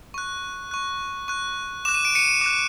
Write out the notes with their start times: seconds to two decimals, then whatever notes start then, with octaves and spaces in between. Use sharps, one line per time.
0.14 C#6 F#6
0.71 C#6 F#6
1.28 C#6 F#6
1.85 D6 F#6 E7
1.94 D#7
2.05 D7
2.15 C#7 D#7
2.41 D6 F#6